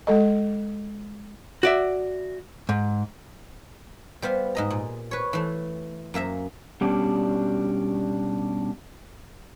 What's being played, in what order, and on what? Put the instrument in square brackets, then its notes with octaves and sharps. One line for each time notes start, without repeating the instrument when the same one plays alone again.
[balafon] G#3 A4 D#5
[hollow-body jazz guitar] F#4 D5 E5
G#2
[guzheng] G3 B3 C5 F5
G#2 D#5 A#5
A#2
B4 C#5
E3 A3
F#2 A#3 E5 A#5
[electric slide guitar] B2 G3 C#4 D4